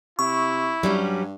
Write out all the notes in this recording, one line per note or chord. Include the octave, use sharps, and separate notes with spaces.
C3 E4 C#6
G2 F#3 G3 C#4